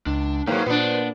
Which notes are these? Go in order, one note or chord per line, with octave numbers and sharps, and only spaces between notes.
C#2 D4
G#2 F#3 A#3 B4 C5
A#2 B3 D4